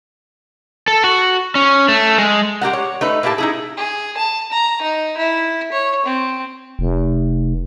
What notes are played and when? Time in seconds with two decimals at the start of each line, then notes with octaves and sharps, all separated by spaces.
0.88 A4
1.04 F#4
1.55 C#4
1.88 A3
2.18 G#3
2.61 G#3 G4 A#4 F#5
2.73 C#5
3.01 A3 D#4 B4
3.23 A2 A#3 E4 G4 A5
3.38 D#4 E4 G#4
3.77 G#4
4.17 A5
4.52 A#5
4.82 D#4
5.17 E4
5.72 C#5
6.06 C4
6.79 F1